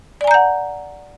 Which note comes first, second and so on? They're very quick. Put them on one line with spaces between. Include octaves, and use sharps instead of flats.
D5 G#5 A#5 G6 F#5